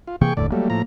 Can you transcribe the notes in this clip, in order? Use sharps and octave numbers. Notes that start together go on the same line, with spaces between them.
F4
C3 E3 A#3 G#4 G5 C#6
F#1 D#2 A2 D3 D5
F#3 G3 A3 A#3
A2 F3 A#5